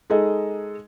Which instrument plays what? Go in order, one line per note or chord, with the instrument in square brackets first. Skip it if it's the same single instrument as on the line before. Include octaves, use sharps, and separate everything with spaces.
[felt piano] G#3 D#4 G#4 A4 D#5